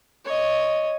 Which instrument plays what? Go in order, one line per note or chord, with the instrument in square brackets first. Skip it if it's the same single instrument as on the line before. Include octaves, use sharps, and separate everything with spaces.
[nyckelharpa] C#5 D#5